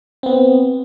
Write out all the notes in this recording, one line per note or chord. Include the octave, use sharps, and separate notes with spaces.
B3 C4